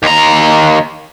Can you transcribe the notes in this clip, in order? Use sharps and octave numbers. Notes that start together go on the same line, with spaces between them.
D#2 A#5